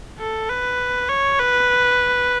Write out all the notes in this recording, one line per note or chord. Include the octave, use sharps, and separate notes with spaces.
A4
B4
C#5
B4